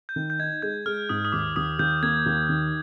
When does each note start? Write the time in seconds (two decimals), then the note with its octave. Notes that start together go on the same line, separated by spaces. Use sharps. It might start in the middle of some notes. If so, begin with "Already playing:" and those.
0.09 G6
0.16 D#3
0.30 G6
0.39 D#4 G#6
0.62 G#3 G6
0.86 G#3 F6
1.09 G#2 D#6
1.25 D#6
1.32 D#2 D6
1.56 D#2 D#6
1.79 D#2 G6
2.03 A#3 G#6
2.26 D#2
2.49 D#3